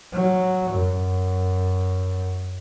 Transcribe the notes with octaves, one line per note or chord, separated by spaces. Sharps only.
F#3
F#2